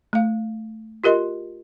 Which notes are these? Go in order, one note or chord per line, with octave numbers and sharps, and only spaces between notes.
A3 F5
F4 G4 A#4 D#5 C6